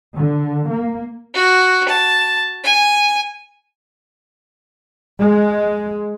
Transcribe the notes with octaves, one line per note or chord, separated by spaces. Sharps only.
D3
A#3
F#4
A5
G#5
G#3